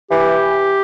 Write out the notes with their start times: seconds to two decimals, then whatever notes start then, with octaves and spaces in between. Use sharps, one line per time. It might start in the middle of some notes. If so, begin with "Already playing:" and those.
0.11 E3 G4